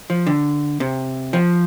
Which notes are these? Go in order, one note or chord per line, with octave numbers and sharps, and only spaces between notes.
F3
D3
C3
F3